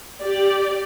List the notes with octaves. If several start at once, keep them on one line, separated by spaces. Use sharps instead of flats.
G4 D5